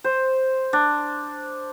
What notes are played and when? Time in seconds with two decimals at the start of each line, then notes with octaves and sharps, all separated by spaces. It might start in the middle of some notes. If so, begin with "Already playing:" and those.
0.04 C5
0.73 D4